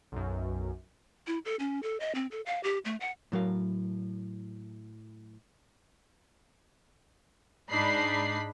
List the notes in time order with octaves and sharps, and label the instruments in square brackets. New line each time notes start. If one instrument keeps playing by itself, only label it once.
[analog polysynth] B1 F#2
[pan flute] E4
A4
C#4
A4
D#5
C4
A4
F5
G4
A3
F#5
[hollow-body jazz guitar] A2 F#3 A#4 F5
[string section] G#2 G#3 D4 D#4 B5 C7